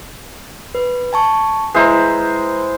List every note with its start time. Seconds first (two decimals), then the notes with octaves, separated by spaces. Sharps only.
0.75 B4
1.13 G#5 A5 C#6
1.75 G#3 E4 B4 C5 A#5